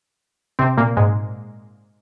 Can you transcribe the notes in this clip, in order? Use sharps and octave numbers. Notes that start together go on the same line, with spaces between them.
C3 C4
A#2 A#3
G#2 G#3